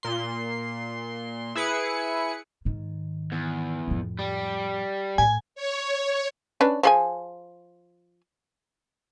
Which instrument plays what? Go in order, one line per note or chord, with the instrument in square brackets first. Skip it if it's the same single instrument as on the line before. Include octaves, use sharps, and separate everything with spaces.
[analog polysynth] A#2 C6
E4 G#4 B4 C#7
[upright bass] G#2 D#3
[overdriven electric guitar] E2
[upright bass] F2 A2
[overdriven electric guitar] G3
[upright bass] A2 [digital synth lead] G#5
[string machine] C#5
[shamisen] C#4 D4 B4
F3 G#4 G#5